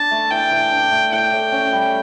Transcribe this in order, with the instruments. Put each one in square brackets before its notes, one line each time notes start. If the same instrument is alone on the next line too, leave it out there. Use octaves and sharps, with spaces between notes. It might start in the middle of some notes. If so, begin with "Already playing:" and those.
Already playing: [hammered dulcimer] D4 [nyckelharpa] A5
[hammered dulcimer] A3
[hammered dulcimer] E3 [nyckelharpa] G5
[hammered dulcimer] E3
D4
A3
[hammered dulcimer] A2 [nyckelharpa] G5
[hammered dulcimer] A2
C#4
G3